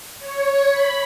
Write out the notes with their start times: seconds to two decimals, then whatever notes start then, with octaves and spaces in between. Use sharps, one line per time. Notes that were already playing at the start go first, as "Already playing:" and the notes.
0.20 C#5
0.71 B5